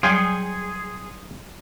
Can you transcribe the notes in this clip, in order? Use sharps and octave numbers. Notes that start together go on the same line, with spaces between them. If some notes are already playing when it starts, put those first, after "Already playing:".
F#3 G3 G#4 F5 G5 G#5 C6 C#7